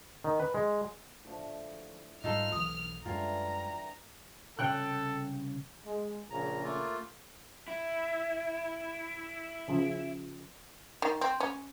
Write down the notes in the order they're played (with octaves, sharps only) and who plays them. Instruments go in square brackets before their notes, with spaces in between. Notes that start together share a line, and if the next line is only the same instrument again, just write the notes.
[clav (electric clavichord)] D#3
B4
G#3
[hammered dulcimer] A2 D3 F3
[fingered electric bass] G#2 G3 [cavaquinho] D#4 F4 A4 [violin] F6
[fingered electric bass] B1 E3 [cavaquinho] D#6
[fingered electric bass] F#2 G#3 [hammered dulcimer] D3 E3 G3 [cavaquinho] F4 G#5 [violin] A#5
[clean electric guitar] C2 C#3 C#5 [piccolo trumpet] A4 [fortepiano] G5 F#6
[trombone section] G#3
[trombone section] A#1 C#3 [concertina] A#5
[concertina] A3 A#3 F4
[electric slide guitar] E4
[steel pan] C#3 F3
[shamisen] D#3
C4
C#4